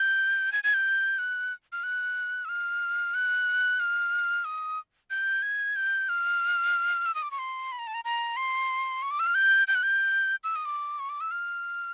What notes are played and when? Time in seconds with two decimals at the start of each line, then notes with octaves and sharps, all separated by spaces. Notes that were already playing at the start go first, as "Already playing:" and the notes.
Already playing: G6
0.53 G#6
0.64 G#6
0.74 G6
1.19 F#6
1.72 F6
1.84 F#6
2.45 E6
2.49 F6
3.14 F#6
3.80 F6
4.45 D#6
5.10 G6
5.42 G#6
5.76 G6
6.09 F6
7.06 E6
7.15 D#6
7.22 D6
7.31 C#6
7.39 C6
7.72 B5
7.79 A#5
7.87 A5
7.94 A#5
8.05 A#5
8.37 C6
9.02 C#6
9.11 D6
9.19 E6
9.26 F6
9.35 G6
9.68 G6
9.75 F#6
9.83 G6
10.44 E6
10.56 D#6
10.65 D6
10.99 C#6
11.09 D6
11.21 E6
11.31 F6